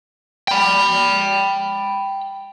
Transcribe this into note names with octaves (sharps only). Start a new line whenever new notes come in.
G5 B5